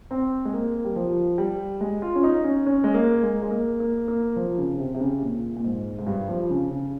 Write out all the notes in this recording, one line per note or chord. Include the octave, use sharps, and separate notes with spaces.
C4
G#3
A#3
G3
F3
G3
G#3
F4
C#4
D#4
C#4
C#4
G#3
A#3
G#3
G#3
A#3
A#3
A#3
F3
C#3
C#3
C3
C3
C#3
A#2
A#2
G#2
G#2
G2
F3
C#3
C#3